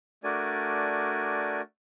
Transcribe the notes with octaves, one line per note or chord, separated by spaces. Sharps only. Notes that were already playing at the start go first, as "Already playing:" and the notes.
A3 D4 F#4 A#4 D5 G#5